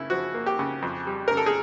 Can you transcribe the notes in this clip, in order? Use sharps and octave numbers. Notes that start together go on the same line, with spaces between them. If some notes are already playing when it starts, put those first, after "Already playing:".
Already playing: C#3 A#3 E4
F3 F#4
A#3
G4
C#3
F2
G3
C#3 A#4
A4
G#4